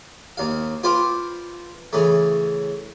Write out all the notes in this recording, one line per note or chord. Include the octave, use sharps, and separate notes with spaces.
D#2 F5
F4 B4 C5 F5 G5 D6
C#3 E3 A3